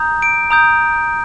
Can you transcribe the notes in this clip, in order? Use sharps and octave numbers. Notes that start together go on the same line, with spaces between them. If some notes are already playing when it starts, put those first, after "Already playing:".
Already playing: A#5 D#6 G6
D7
A#5 D#6 G6